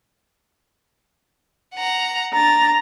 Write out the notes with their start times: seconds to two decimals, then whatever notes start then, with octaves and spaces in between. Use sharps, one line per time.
1.75 F#5 A#5
2.33 D4 A#5 A6